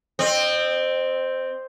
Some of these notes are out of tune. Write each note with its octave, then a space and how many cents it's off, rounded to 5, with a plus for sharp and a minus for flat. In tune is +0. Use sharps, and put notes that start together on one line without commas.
C4 +0 D#5 -30